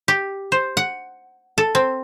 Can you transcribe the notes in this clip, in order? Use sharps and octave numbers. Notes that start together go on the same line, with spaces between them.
G4
C5
F#5
A4
C4